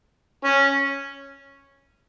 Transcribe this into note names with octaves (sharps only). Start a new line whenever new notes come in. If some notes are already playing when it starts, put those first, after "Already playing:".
C#4